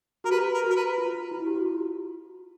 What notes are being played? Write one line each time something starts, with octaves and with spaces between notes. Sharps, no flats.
F#4 A#4
G4 B4
A#4
F#4
A#4
B4
F4
E4
G4
F#4
F4